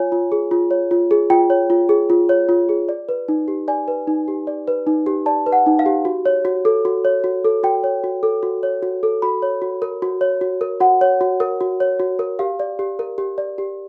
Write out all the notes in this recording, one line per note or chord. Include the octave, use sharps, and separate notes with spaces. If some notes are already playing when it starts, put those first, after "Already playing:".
Already playing: F4 C#5 G#5
F4
G#4
F4
C#5
F4
G#4
F4 G5
C#5
F4
G#4
F4
C#5
F4
G#4
D5
B4
D#4
G4
D5 G#5
B4
D#4
G4
D5
B4
D#4
G4
D5 A5
B4
F#5
D#4
F5
G4
F#4
C#5
F#4
A4
F#4
C#5
F#4
A4
F#4 G5
C#5
F#4
A4
F#4
C#5
F#4
A4
F#4 B5
C#5
F#4
A#4
F#4
C#5
F#4
A#4
F#4 F#5
C#5
F#4
A#4
F#4
C#5
F#4
A#4
G4 F5
D5
G4
A#4
G4
D5
G4